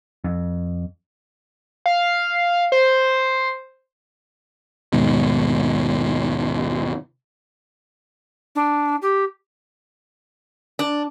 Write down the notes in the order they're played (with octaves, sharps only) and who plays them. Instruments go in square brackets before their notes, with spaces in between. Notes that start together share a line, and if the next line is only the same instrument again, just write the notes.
[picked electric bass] F2
[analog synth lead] F5
C5
[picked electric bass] D#2 G#2 B2
[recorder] D4
G4
[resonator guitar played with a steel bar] D4